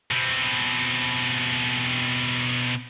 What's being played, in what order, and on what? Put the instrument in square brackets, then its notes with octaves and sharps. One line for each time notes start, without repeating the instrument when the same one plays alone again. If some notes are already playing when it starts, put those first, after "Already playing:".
[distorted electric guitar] B2 C4